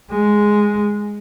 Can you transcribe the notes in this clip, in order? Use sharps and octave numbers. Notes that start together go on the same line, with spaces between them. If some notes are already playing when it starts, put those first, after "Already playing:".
G#3